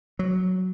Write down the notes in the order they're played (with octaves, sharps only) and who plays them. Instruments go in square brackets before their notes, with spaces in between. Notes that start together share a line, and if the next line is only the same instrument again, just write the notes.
[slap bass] F#3